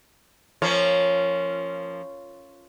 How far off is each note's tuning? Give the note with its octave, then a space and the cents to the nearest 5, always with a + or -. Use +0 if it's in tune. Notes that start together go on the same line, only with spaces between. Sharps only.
F3 -10 A#3 -25 C#4 +0